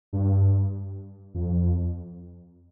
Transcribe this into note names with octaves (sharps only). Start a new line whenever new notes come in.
G2
F2